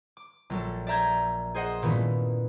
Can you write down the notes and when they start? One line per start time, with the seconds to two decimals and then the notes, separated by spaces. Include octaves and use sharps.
0.17 D6
0.50 A#1 F#3 A4
0.87 D5 E5 A#5 G6 G#6
1.55 G#4 C5 D#5 F#5
1.82 G2 A#2 D#3 E3 B3 C#4